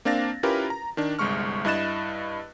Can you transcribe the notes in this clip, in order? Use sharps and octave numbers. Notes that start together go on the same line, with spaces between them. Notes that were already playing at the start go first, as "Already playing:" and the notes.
A#3 C4 D4 F5 A6 A#6
C#4 E4 F4 G4 A#4 B4
A#5
D#3 D4
G1 C2 G#3 C#6 F6
G2 E4 D#5 F#6 A6 E7